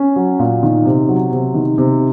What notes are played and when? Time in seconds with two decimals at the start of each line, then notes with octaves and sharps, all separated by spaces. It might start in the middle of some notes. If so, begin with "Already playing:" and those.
Already playing: C#4
0.16 F#3
0.39 A#2
0.63 D#3
0.85 C3
1.08 F#3
1.32 C3
1.54 D#3
1.78 C3